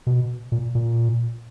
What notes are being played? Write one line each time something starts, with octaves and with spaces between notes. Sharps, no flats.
B2
A#2
A#2